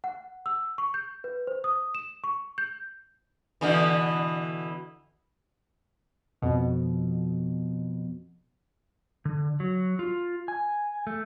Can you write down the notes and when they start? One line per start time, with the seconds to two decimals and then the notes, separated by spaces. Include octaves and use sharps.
0.04 F#5
0.46 E6
0.78 C#6
0.94 G6
1.24 B4
1.47 C5
1.64 D#6
1.95 E7
2.24 C#6
2.58 G6
3.61 B2 D3 E3
6.42 F2 B2
9.25 D3
9.60 F#3
9.99 F4
10.48 G#5
11.07 A3